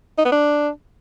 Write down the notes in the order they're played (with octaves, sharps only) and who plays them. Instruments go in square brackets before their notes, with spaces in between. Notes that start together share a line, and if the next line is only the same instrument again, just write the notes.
[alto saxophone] D#4
B3
D4